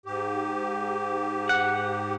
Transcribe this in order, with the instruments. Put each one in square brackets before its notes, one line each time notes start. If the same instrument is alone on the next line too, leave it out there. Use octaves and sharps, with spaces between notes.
[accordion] G#2 G4
[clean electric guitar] F#5